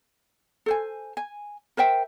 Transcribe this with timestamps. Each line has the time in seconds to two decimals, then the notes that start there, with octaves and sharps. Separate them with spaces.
0.66 A4 C5 G#5
1.17 G#5
1.77 A#4 C5 E5 G5